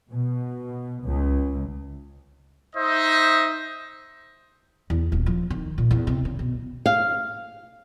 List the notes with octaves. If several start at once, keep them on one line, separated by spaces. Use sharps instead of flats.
B2
C#2
D#4 C5 D#5 E5
E2
D#1
F3
D#3
A#2
E2
C3
C#3
B2
F5